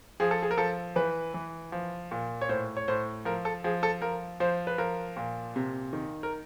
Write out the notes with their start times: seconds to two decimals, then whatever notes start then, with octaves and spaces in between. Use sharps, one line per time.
0.20 F3 G#4
0.31 A4
0.43 G#4
0.51 A#4
0.58 F3 A4
0.96 E3 B4
1.34 E3
1.72 F3
2.11 A#2
2.41 C#5
2.49 A2 C5
2.77 C#5
2.88 A2 C5
3.25 F3 A#4
3.45 A4
3.64 F3 G#4
3.83 A4
4.02 F3 A#4
4.40 F3 C5
4.67 B4
4.78 F3 A#4
5.17 A#2
5.56 C3
5.93 D#3
6.23 A#4